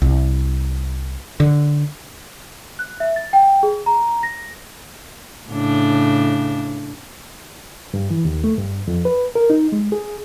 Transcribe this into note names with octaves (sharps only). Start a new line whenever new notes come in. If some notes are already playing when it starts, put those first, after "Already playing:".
C2
D3
F#6
E5
A6
G5
G#4
A#5
A#6
A2 C#3 D4
G2
E3
D#2
A3
G2
F2
B4
A#4
D#4
G#3
G#4